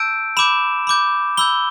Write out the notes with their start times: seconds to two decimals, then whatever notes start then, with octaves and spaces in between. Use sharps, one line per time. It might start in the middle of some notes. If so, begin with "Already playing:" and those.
Already playing: A5 E6 G6 D7
0.37 B5 D6 G6 E7
0.87 B5 D6 G6
1.37 B5 E6 G6 G7